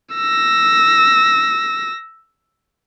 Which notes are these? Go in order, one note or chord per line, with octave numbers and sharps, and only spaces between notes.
E6 A#6